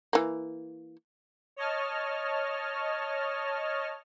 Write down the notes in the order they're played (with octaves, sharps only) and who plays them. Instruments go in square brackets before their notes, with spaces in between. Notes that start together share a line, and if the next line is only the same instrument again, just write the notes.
[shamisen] E3 A#3
[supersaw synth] C#5 D#5 A5 F6